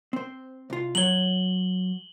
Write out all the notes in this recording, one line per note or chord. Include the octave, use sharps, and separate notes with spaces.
C4 C5
C2 F4
F#3 C#5 F#7 G7